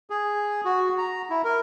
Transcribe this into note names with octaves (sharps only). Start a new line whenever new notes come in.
G#4
F#4
A#5
E4
A#4